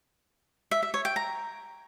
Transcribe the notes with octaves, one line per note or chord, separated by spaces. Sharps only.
E5
E5
C#5
G5
A#5